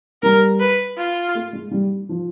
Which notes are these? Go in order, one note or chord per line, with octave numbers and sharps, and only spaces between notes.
G3 A#4
B4
F4
A3
G#3
G3
F3